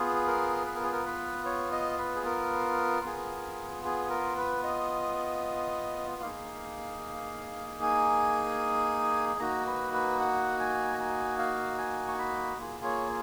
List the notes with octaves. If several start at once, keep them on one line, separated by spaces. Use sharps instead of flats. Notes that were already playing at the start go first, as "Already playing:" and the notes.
Already playing: B3 F4 G#4
A#4
B4
A#4
G#4
A#4
B4
C#5
D#5
B4
G#4
A#4
B3 F4 G#4
G#4
A#4
B4
D#5
A#3 D#4 G#4 F5
G#5
A#3 D#4 F#4 A#5
B4
B4
F#5
G#5
A#5
G#5
F5
G#5
C#6
B5
A#3 F4 G#4
C#5